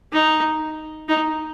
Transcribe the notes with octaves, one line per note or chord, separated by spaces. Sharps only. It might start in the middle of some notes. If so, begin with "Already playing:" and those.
D#4
D#4